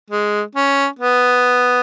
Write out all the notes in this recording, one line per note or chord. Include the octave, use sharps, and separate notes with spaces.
G#3
C#4
B3